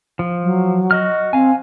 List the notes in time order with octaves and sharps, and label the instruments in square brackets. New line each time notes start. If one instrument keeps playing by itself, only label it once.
[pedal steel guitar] F3
[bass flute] F#3
[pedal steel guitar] F#4 D#5 F6
[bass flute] C4 [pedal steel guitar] F5 G#5